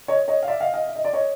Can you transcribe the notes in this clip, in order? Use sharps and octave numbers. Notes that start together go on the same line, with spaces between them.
C#5 D#5
C#5 D#5
F5
D5 E5
D#5 F5
D#5 F5
E5
D#5
D5
C#5 D#5